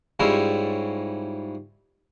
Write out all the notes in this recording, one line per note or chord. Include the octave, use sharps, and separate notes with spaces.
G#2 G3 C#4 E4 F4